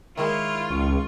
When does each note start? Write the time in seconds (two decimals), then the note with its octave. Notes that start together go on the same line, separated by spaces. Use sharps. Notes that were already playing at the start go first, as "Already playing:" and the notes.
0.17 D#3 G#3 E4 F4 C#5
0.70 C#2 C#6